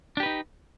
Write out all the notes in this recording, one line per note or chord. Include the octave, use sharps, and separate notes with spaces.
D4 D#4 G4 B4